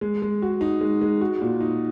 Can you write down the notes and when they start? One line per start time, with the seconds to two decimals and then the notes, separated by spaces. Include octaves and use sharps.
0.01 G#3
0.22 G#3
0.42 F#4
0.61 D#4
0.81 G#3
1.01 G#3
1.21 F#4
1.41 A#2
1.61 D#4